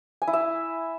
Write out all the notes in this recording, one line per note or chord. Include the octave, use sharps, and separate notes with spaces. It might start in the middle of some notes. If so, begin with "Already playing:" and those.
G#5
E4
E5